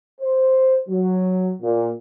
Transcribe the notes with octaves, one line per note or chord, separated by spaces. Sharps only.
C5
F#3
A#2